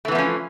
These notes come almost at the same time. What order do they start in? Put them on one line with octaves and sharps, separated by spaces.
A3 E3 B3 F3 C#4